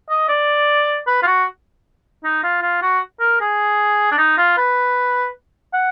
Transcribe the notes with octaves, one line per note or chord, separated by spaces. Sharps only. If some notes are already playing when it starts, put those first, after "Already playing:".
D#5
D5
B4
F4
F#4
D#4
F4
F4
F#4
A#4
G#4
D4
D#4
F4
B4
F#5